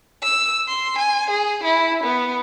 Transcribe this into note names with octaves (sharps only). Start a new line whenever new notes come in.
E6
C6
G#5
G#4
E4
B3